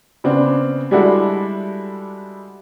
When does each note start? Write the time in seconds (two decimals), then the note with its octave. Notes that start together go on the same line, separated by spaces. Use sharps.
0.24 C#3 B3 C4 D4
0.91 G3 G#3 D4 E4 F#4 A4